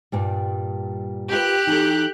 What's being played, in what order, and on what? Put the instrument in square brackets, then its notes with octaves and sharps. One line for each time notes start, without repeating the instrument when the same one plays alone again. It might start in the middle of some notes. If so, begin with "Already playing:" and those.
[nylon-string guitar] G2 A#2 G3
[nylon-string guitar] F4 A#4 B4 [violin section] G4 F#6
[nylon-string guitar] E3 F#4 A4 [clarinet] D#4